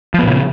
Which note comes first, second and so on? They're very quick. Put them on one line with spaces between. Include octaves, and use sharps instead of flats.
F3 B3 A#2 C#3